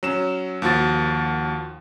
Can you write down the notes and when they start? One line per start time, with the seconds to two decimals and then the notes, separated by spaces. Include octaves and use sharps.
0.03 F#3 C#4 E7
0.62 D#2 F3 F#4 A6